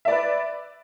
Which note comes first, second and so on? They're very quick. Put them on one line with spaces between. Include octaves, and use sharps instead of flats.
E5 D5 B4